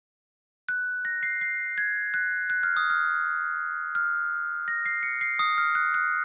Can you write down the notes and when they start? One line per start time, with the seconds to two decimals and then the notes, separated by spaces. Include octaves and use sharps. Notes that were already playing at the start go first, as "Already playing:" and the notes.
0.69 F#6
1.05 A#6
1.23 C7
1.41 C7
1.78 G#6
2.14 F#6
2.50 F#6
2.63 F6
2.77 D#6
2.90 F6
3.95 F6
4.68 A#6
4.86 C7
5.03 C#7
5.21 C7
5.39 D#6
5.58 F6
5.75 F#6
5.94 F#6